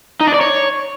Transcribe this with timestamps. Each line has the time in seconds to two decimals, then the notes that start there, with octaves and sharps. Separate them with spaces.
0.20 D#4
0.27 D4
0.34 D5
0.41 C#5